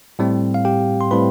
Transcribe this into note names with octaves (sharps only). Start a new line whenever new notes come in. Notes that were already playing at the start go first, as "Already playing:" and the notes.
A2 G3 C4
F5
G4 G5
C6
A2 G3 C4 B4 B5